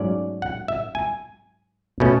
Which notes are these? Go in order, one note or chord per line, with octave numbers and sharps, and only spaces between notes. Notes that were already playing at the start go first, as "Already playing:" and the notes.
Already playing: G#2 F#3 A3 C#4 D5
F#5
E5
G#5
B2 A3 C#4